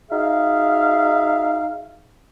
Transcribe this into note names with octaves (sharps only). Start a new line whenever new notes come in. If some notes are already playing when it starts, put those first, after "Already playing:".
D#4 F#4 G#4 E5 F5